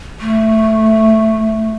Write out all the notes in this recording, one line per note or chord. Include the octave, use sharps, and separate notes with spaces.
A3